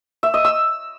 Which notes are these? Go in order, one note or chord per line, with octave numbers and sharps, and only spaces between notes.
E5
D#5
E6